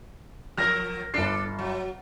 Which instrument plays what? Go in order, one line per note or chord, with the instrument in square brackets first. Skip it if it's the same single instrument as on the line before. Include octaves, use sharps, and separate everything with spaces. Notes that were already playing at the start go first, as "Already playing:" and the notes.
[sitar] F3 A#4 [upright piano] F6 A#6
[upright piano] G1 C7 [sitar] D4 A4
[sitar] F#3